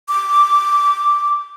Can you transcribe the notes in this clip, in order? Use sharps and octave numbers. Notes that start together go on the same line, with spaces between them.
D6